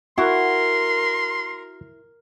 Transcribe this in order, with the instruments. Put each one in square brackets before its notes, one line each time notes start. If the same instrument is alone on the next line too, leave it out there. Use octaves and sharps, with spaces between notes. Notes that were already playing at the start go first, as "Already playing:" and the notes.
[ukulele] E4 [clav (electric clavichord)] F#4 [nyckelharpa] A#4 [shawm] C6